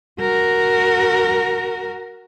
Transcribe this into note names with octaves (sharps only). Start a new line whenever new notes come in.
F#4 A#4